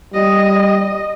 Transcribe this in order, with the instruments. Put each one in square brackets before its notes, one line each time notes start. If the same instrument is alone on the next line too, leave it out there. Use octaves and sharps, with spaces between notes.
[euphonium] G3 [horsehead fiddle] D#5